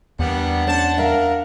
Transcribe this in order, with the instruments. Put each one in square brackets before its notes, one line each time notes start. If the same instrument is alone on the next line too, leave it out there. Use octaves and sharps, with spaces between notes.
[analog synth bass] E2 [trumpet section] G3 A#3 B3 [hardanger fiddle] D4 F#5
[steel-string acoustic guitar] C#4 C5 [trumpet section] A5
[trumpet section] A#4 [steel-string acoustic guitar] E5 F5